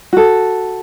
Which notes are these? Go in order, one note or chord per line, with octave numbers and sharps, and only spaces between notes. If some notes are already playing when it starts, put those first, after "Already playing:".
F#4 A4